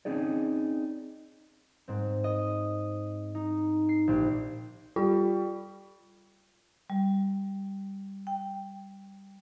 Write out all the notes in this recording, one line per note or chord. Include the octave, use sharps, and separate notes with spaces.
C4 C#4 D#4 G#4 D5
G#2 C4
D#5
D#4
C7
A#1 G4
G3 F4
G3
G5